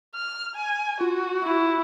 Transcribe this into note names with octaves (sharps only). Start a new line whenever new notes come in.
F6
G#5
F4 F#4
E4